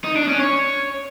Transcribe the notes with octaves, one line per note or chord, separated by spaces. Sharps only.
D#4
D4
C#4
C#5